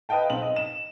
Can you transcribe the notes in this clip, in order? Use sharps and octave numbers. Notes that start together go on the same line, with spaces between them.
B4 D#5 F5 G5 A5
B1 C4 F#7
D#5
E7